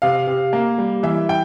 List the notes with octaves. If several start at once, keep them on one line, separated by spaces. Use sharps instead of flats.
C3 F5
C3
A#3
G3
E3 E5
G5